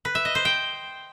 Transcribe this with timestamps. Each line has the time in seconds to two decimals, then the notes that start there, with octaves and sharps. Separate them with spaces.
0.05 B4
0.15 E5
0.25 D#5
0.35 C5
0.45 G5